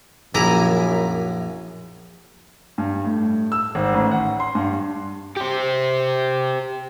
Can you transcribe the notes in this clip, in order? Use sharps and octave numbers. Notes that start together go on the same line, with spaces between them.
A#1 F#2 E4 G#5 A#5 D6
G2
A2
E6
G#1
A1
F#5
C6
G2
G4 C5